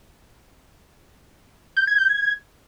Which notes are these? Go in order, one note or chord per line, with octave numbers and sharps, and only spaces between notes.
G6
G#6
G6
G#6